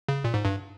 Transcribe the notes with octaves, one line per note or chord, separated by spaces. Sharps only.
C#3
A#2
G#2
G2